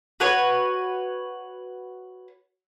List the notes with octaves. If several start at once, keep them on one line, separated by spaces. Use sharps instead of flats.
F#4 B4 C#5